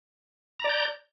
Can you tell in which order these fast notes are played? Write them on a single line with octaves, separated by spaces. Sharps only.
A#5 D5 G6